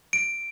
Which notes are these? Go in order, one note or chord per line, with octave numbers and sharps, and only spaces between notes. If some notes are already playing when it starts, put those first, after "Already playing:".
D7